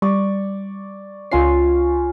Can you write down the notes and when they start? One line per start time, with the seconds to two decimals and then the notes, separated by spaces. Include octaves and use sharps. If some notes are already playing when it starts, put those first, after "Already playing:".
0.02 G3 D5 C#6
1.32 C#2 C#4 F4 C7